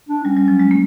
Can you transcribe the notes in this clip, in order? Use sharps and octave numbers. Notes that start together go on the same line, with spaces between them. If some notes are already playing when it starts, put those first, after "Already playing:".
D4
G3 C#4
G3
F#3
G#3
A#3